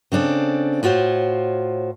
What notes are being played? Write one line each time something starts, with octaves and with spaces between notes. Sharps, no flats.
C#3 C4 D4 A4
A2 F4 F#4 C5 C#5